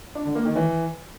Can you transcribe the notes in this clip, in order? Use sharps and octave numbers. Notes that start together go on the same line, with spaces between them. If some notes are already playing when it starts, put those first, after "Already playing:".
D4
D3
A#3
D#3
E3